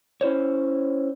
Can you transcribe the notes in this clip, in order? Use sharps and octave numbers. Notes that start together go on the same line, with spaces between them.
C#4 E4 C5 C#5